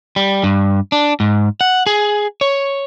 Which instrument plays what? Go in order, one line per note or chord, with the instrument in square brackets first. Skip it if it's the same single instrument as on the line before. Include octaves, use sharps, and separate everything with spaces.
[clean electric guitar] G3
G2
D4
G#2
F#5
G#4
C#5